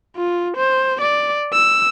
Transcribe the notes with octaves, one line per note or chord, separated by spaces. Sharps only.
F4
C5
D5
E6